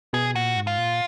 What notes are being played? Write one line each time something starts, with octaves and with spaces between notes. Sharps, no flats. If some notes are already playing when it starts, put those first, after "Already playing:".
B2 G#4
A#2 F#4
G#2
F4
A#2